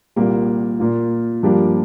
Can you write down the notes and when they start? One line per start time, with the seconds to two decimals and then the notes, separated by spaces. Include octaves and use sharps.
0.16 C2 A#2 A#3 G4
0.80 A#2 A#3 F4
1.43 G2 F3 A#3 D4 G4